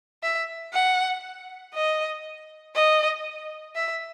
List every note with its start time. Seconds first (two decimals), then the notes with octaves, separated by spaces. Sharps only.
0.23 E5
0.73 F#5
1.74 D#5
2.75 D#5
3.76 E5